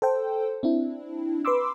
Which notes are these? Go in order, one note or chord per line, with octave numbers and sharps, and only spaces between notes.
A4 C5 G5
C4 D4 E4
B4 B5 C6 D6 E6